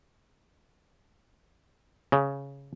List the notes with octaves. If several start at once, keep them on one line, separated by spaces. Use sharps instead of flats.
C#3